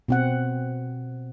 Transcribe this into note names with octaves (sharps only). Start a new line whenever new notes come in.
B2 C4 F#5